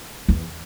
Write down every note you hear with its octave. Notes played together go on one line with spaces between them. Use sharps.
E2